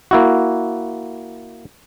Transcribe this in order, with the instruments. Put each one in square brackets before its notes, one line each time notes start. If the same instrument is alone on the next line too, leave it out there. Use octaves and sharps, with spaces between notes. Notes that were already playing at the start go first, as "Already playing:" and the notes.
[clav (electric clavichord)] A#3 E4 F#4